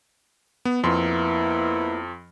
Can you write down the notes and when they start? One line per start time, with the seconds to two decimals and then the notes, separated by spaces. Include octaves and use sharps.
0.65 B3
0.84 F2 A#3 B3 E4 C6